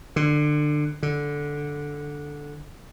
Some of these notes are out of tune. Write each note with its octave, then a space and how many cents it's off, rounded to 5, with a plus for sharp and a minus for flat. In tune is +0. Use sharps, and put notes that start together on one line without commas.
D3 +25
D3 -5